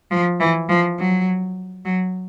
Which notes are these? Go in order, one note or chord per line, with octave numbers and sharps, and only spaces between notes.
F3
E3
F3
F#3
F#3